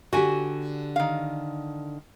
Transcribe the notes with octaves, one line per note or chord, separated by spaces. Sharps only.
D3 D4 F#4 G4 G#5
D#3 F5